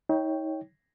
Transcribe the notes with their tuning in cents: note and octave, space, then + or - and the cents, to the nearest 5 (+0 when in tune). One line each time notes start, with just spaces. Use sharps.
D#4 +40 C#5 +0 G5 +0